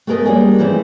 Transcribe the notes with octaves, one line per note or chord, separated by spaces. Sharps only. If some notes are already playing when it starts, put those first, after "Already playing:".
A3 B3 G#4 A#4 D#5
G3 A#3 C#4 D4 G4 G#4
E3 F3 A3 C4